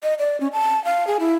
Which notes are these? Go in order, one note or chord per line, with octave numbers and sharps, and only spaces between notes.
D#5
D5
C#4
A5
F5
G#4
E4